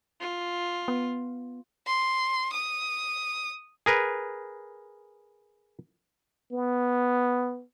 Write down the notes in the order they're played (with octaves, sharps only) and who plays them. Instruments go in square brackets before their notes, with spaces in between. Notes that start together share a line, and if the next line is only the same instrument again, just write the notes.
[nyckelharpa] F4
[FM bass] B3
[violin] C6
D#6
[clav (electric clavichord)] G#4 A#4 B4
[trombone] B3